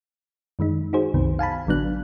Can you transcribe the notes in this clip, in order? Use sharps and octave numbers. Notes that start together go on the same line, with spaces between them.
F#2 D#3 G#3 D#4
D#4 F#4 G#4 C5
C2 F#2 C3 D#3 B3
F5 G#5 A5 B5
A1 D3 F#3 B3 D4 F#6